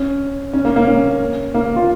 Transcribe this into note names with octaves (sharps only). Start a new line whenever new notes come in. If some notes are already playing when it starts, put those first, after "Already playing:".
Already playing: C#4
C#4
A#3
A#3
C#4
A#3
F4